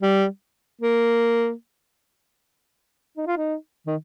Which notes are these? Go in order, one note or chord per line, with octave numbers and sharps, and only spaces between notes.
G3
A#3
D#4
F4
D#4
D#3